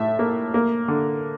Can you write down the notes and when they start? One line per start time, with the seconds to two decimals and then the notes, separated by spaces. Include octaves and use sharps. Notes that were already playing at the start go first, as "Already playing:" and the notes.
Already playing: A2 E5
0.19 A#3
0.54 A#3
0.88 D3